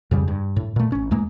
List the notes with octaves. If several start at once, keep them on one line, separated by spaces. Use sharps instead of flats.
F2 C#3 G3
G2
A2
A#2 A3
A1 C#4
E2 G#3 A#3